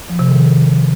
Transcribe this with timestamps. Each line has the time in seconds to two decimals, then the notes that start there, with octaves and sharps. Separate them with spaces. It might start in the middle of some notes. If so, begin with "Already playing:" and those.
0.10 F3
0.19 C3
0.29 D#3